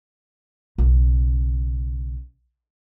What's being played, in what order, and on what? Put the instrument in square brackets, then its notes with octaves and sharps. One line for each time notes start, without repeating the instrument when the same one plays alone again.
[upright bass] B1 C#3